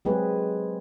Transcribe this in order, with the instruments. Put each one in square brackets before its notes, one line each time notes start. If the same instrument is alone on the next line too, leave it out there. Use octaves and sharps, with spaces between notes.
[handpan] F#3 G#3 C4 G4 G#4 B4